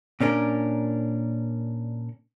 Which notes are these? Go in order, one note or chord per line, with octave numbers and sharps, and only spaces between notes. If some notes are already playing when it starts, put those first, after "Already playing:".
A#2 C#4 D4 A#4